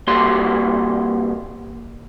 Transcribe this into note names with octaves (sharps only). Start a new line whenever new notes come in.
C2 A#3 F#4 G4 C5 C6